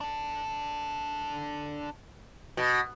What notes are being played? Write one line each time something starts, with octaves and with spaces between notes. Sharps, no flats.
D4 A4
B2